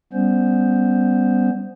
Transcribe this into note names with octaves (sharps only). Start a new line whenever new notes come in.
G3 B3 C#4 C5